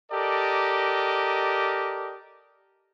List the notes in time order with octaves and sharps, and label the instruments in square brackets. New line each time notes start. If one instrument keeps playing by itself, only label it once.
[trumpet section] G4 A4 A#4 D5 D#5